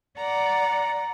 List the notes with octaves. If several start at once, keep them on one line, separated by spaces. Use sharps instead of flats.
D5 F#5 A#5